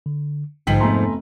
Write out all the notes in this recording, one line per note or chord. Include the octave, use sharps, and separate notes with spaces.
D3
A#1 G#2 D3 F3 F4 G5 B6 F#7
F1 A3 B3 G#5 A#5 C6